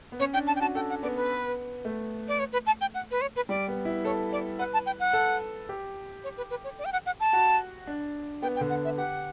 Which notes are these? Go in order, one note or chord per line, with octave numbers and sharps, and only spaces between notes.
B3
C#4 C#5
D4 G5
A5
G5
F#4 A5
A4 G5
F#5
B3 D5
B4
A3
D5
C#5
B4
A5
G5
F#5
B4
C#5
B4
G3 D5
B3
E4
A4 C#5
D5
B4 F#5
A5
G5
F#5
A4
G4
C#5
B4
B4
C#5
D5
G5
F#5
F#5
A5
F#4
D4
B3 G5
G5
D3
F#5
E5
G4 F#5